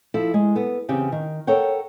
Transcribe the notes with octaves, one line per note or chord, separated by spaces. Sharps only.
F3 E4 A4
G#3
B3 A4
E2 C#3 C4 G4 G5
D#3
A4 A#4 C#5 F#5 G5